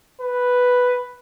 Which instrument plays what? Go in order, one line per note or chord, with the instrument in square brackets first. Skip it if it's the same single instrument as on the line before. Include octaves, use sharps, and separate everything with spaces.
[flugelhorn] B4